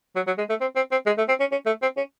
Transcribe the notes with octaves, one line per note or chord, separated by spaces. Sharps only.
F#3
F#3
G#3
A3
C4
C4
C4
G#3
A3
C4
C#4
C#4
A3
C4
C#4